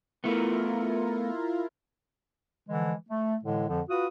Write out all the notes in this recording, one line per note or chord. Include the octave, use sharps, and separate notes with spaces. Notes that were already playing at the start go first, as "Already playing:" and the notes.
A3 B3 E4 F4 A#4
D3 E3 F3 G#3
A3
A2 D3 E3 G#3
F2 D3 F3
F4 F#4 B4 D#6